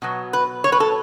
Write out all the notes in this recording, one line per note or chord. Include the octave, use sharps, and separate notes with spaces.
B2 F#3 B3
B4
C#5
B4
A4